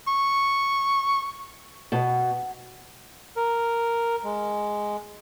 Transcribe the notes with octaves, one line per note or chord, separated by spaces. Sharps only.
C#6
B2
A#4
G#3